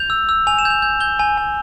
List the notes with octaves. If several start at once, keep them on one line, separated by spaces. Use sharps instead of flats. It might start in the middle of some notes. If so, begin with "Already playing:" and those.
Already playing: G6 F7
E6
E6
G#5 F7
E7
G6
F7
G6
G6 G7
G#5
G#5